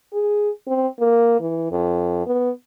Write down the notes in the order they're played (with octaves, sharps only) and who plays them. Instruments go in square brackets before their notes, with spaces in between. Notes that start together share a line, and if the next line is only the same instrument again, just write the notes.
[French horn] G#4
C4
A#3
E3
F2
B3